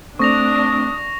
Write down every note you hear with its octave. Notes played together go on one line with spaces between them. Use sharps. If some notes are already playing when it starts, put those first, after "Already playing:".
A3 C4 D4 C#6 D#6 A#6 F7